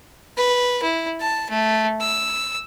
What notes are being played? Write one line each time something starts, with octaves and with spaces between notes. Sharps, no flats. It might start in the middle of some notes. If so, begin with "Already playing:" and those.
B4
E4
A5
A3
E6